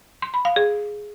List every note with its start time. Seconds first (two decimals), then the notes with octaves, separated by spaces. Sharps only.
0.22 C6
0.34 B5
0.45 F5
0.56 G#4